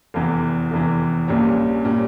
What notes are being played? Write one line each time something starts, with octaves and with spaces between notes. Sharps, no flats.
F1 E2 E3
F1 E2 E3
A#1 A#2 G3 C#4
A#2 G3 C#4